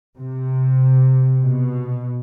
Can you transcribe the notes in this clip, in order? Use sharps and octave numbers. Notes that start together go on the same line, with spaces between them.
C3
B2